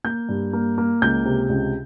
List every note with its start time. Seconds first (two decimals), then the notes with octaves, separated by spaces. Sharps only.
0.04 A#3 G6
0.29 G2
0.53 A#3
0.78 A#3
1.02 C#2 G6
1.25 C3
1.50 C#2